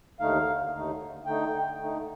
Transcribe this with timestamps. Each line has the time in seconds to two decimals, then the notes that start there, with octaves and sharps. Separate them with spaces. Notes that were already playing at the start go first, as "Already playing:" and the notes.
0.20 D#2 D3 A3 D#4 F5
0.73 D#2 D3 A3 D#4
1.26 D3 A3 D#4 G5
1.79 D3 A3 D#4